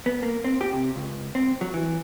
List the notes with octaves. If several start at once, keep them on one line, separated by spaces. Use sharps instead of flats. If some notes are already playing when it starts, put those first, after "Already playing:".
B3
A#3
C4
G4
C3
C#2
C4
F#3
E3